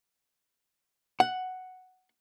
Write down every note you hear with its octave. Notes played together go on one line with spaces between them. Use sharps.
F#5